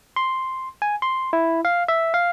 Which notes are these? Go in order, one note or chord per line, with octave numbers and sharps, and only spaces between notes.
C6
G#5
C6
E4
F5
E5
F5